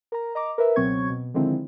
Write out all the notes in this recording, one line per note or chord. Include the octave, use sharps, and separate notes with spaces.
A#4 A#5
D#5 A#5 D6
A#4 B4 E5
C#2 B2 F#3 C4 C#6 G#6
B2
D3 D#3 F3 G#3 C4 E4